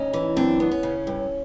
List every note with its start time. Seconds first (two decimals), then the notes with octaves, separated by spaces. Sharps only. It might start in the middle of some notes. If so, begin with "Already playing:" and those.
Already playing: D2 C#4 D#4
0.13 E3
0.36 F#2 C4 D4
0.60 B3
0.71 C#4
0.83 C#3
1.07 G2